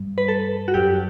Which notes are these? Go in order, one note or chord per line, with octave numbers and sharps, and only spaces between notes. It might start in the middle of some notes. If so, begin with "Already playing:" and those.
Already playing: G2
B4
A4
F#4
F#2 G4